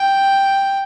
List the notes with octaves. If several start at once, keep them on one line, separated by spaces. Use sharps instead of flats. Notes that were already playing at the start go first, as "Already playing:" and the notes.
Already playing: G5